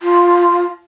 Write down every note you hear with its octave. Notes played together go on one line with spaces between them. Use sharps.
F4